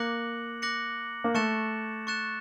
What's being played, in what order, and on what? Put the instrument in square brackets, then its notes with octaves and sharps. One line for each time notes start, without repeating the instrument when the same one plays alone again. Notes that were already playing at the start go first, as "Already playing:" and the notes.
Already playing: [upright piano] A#3 [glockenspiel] D6 F#6 A#6 C#7 F#7
[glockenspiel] D6 F#6 A#6 C#7 F#7
[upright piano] A#3
[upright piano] A3 [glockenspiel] C#6 F#6 A6 C#7 E7
[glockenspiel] C#6 F#6 A6 C#7 E7